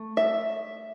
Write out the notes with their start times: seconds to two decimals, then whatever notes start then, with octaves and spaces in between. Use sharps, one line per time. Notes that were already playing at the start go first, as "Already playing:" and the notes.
Already playing: A3
0.17 E5